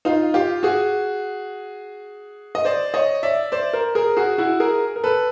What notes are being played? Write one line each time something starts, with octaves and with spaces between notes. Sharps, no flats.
D#4 F4
F4 G4
F#4 G#4
D#5
C5 D5
C#5 D#5
D5 E5
C5 D5
A#4 C5
G#4 A#4
F#4 G#4
E4 F#4
G#4 A#4
A#4
A4 B4